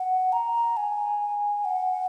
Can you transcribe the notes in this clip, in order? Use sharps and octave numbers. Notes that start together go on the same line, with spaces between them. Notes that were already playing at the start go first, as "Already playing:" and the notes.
Already playing: F#5
A#5
G#5
F#5